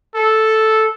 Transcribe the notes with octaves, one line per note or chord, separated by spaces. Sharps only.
A4